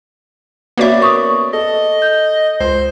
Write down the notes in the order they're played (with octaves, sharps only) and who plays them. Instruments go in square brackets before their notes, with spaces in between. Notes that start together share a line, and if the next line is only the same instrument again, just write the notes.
[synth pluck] A#3 F#4 E5 [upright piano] B3 C#4 D5
[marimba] A#4 C#6 D#6
[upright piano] A4 [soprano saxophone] D#5
[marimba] G6
[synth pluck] C#2 [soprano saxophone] C5